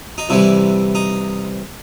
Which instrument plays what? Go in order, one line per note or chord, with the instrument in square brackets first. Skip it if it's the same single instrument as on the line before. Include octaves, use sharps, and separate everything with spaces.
[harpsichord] D#4
C2 C3 E3 G3 E4
D#4